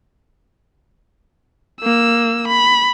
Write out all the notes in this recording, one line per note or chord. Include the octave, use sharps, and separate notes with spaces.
A#3 E6
B5